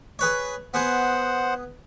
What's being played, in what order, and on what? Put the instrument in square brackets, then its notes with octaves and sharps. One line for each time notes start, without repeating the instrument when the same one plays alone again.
[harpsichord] G#4 B4 C#5
[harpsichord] B3 G#4 [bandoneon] C5 F#5